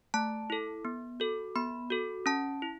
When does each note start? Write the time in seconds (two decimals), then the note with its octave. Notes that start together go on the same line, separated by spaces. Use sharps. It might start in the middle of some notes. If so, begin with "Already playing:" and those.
0.14 A3 A5
0.50 E4 A4
0.85 B3
1.20 F#4 A4
1.56 B3 B5
1.90 F#4 A4
2.26 C#4 A5
2.62 E4